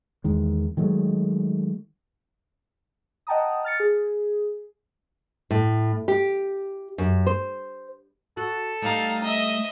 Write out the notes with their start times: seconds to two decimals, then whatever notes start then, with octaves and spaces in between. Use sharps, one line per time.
0.24 E2 D#3 G#3
0.77 D#3 F#3 G#3 A3
3.27 D#5 F#5 G5 A5 A#5 D#6
3.64 F6 A6 C#7
3.80 G#4
5.51 A2
6.08 G4
6.98 F#2
7.27 C5
8.37 F#4 A4
8.82 G3 A3 D#4 F5
9.23 D#5 E5